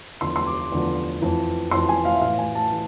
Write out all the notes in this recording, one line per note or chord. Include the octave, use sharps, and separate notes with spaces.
E2 D3 F3 C6
C6
D6
E2 D3 F3
F2 E3
F2 E3 C6
G#5
F5
E5
A2 E3 F5
G#5
A5
E3